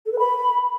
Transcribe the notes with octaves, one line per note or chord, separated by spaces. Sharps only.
A4
B4
B5